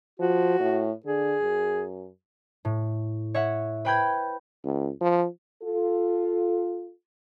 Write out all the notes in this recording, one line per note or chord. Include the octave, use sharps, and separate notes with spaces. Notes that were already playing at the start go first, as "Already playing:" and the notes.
F3 F#4
A2
D3 G#4
F#2
A2
C#5 E5 F#5
B4 C5 G5 B5 G6 G#6
C#2
F3
F4 A4